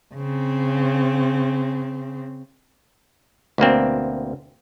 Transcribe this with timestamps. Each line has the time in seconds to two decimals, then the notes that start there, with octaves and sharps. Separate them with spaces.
0.15 C#3 C4
3.58 D2 B2 A#3 C4